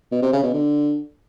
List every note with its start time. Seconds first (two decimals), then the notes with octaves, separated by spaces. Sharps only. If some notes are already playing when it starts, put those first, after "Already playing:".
0.12 B2
0.22 C3
0.33 C#3
0.43 B2
0.53 D3